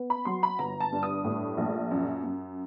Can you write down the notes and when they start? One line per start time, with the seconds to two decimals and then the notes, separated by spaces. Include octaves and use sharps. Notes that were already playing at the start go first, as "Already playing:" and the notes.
Already playing: B3
0.10 B5
0.25 F#3 C6
0.43 B5
0.59 G1 A#5
0.80 A5
0.92 G2
1.03 D#6
1.24 A2
1.57 A#1
1.91 F#2
2.24 F#2